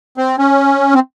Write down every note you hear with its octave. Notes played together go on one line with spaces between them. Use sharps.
C4
C#4
C4